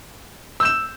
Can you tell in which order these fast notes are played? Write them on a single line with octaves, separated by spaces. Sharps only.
E6 G6 E7